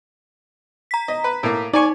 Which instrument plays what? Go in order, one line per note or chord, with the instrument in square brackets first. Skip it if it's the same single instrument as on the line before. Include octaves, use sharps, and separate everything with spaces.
[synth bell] A#5 B6
[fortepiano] D#5
B4
A2 A#3
[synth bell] D#4 [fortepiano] D5 G#5 C#6